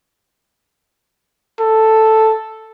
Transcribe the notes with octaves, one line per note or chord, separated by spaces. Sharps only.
A4